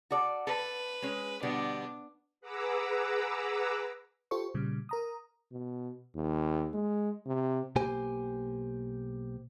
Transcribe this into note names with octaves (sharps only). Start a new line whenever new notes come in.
F#4 A4 D5
A4 B4
G#3 C#4
B2 D3 G3 B3 D4
G#4 B4 F#5 A#5 D6 E6
F4 G4 A4 C5 C#6
A#2 C#3 G3
A#4 A#5 D#6
B2
D#2
G#3
C3
B1 B2 A#3 G4 C5 G#5